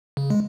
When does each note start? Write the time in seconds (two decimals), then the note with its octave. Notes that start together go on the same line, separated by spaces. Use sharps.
0.17 C#3
0.30 G#3